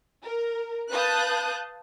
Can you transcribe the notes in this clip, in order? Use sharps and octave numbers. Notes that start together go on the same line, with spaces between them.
A#4
B4 F5 A5 D#6 F#6 G6